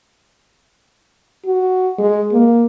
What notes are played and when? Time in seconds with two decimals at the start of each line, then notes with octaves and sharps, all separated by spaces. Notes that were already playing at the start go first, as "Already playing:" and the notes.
1.46 F#4
1.98 G#3
2.32 A#3